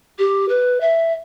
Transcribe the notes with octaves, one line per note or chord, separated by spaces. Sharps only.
G4
B4
E5